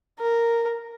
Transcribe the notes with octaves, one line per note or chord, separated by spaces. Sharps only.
A#4